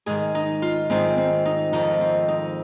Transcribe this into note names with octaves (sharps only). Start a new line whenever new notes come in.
G#2 D#3 G#4
D#4
F4
G#2 D#3 C4
C4
D#4
F2 D#3 D#4
C4
D#4